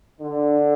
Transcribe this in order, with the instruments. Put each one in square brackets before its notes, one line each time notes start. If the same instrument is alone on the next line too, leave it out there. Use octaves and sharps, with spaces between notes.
[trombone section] D3